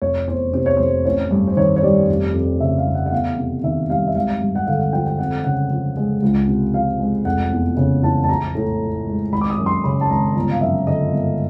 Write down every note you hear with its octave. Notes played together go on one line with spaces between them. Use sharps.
F1 C#5
E2 C5
C3 C5
C#5
F1 C5
A1 C#5
G2
C5
D#3 C#5
C#5
G3 D5
F1
F2
C#3 E5
F5
F1
F#5
F#5
E2 F5
C3
D#3 E5
G3 F5
E5
G#1 F5
G2
F#5
D3 F5
F#5
F3 G5
G5
F2 F#5
C#3 F#5
F3
G#3
C#2
C3
F3 F5
G#3
F1 F#5
E2
C#3
E3 A5
A5
A#1 A#5
A2
F3
G#3
G#1 B5
D6
D#6
F#2
C6
C#3 B5
A5
G#1 A#5
G1 A#5
F5
F#2 E5
D3 D#5
G1